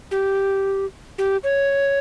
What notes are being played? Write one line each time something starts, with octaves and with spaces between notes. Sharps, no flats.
G4
G4
C#5